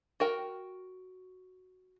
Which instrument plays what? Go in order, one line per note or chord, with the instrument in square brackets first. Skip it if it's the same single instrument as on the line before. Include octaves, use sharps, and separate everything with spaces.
[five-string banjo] F#4 A#4 G5